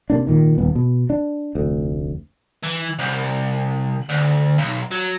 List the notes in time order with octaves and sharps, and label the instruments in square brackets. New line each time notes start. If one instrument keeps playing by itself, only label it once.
[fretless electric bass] C3 A#3 D4
G#1 A#2 D#3
D#1 B3
B2
D4
F1 D2
[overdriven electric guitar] E3
C2
D2
B1
F#3